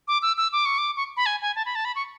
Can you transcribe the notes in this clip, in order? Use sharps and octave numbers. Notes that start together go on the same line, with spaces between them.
D6
E6
E6
D6
C#6
D6
C#6
B5
G#5
G#5
A5
B5
A5
B5
C#6